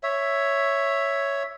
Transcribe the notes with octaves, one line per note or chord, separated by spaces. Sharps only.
C#5 E5